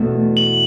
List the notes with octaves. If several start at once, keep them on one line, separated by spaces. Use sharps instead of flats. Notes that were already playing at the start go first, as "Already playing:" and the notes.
Already playing: E2 B2 A3
F#7